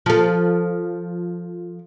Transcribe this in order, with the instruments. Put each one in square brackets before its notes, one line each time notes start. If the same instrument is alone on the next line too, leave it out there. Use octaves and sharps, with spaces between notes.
[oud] F3 A4